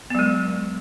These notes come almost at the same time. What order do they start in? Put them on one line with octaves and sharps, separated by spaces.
B3 F#3 G#3